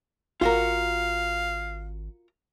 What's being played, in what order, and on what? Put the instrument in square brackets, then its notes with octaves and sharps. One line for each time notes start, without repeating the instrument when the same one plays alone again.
[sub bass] G#1 [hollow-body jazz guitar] F4 F#4 A#4 [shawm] F5